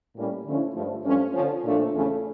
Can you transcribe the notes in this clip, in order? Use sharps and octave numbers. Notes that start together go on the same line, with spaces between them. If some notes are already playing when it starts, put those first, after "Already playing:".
A2 G3 A#3 C#4
D3 F3 A3 C#4 E4
G2 F3 A3
G2 F3 A3 C#4
D3 F3 C#4
A#2 F3 A3 D4
E2 C#3 F3 A3 C#4